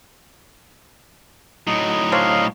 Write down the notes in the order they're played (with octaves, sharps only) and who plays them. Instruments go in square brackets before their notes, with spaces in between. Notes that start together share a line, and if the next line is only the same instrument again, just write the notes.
[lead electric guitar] A2 F#3 [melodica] D#4 D#5
[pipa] C4 D4 C#5 [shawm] F5